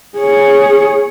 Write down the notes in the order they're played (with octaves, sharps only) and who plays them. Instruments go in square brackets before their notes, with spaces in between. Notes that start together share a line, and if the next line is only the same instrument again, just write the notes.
[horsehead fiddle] G#4 C#5